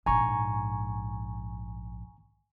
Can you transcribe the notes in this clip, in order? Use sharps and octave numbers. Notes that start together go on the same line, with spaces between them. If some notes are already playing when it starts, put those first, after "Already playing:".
A#1 G#2 G#5 A#5 C#6